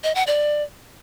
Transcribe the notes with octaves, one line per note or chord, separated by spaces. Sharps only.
D#5
F#5
D5